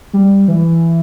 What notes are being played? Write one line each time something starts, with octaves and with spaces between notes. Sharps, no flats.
G3
E3